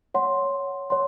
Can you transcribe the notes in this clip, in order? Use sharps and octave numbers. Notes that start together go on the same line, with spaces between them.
C#5 F#5 C6
C#5 F#5 C6